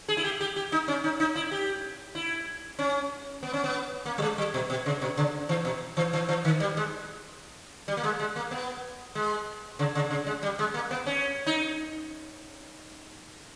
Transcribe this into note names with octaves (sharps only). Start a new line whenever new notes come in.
G#4
E4
G4
G4
G4
D#4
C#4
D#4
D#4
E4
G4
E4
C#4
B3
C#4
B3
A#3
G3
G#3
G3
B2
B2
C#3
B2
C#3
E3
B2
E3
E3
E3
D#3
G3
G#3
G3
A#3
G#3
G#3
A#3
B3
G#3
C#3
C#3
C#3
G#3
G3
G#3
A#3
B3
C#4
D#4